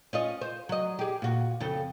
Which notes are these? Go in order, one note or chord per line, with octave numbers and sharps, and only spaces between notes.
C#4 F4 D#5
C5
F#3 D#5
G4 G#4
A#2 F#4
F2 C#3 A4